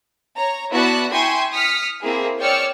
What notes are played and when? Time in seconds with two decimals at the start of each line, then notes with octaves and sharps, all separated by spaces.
0.35 C#5 A#5
0.71 B3 E4 F#4 D5 A5 F#6
1.12 E4 G5 G#5 C6 C#6 G#6
1.51 D#6 F6 B6 C#7
2.02 A#3 C4 E4 G#4
2.39 C#5 D5 G5 E6 F6 C#7